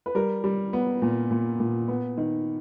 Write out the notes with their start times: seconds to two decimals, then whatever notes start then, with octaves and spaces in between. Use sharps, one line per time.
0.06 B4
0.15 G3 A#4
0.44 G3
0.73 B3
1.02 A#2
1.31 A#2
1.60 A#2
1.88 B3
2.18 D#3